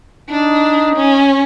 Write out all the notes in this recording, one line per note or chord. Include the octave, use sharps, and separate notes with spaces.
D4 D#4
C#4